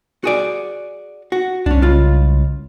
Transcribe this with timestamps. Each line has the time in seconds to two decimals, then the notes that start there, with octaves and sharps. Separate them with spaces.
0.24 F#4 G#4 D5
1.32 F#4
1.66 C2 C#4 D4
1.82 C#2 F4